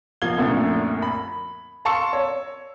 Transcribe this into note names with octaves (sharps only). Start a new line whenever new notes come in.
B2 F3 A#3 F5 G#6 G7
C2 F#2 A#2 D3 F3 A3
B5
F5 A5 C6 C#6 E6 C#7
C#5